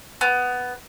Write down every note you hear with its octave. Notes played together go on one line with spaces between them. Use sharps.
B3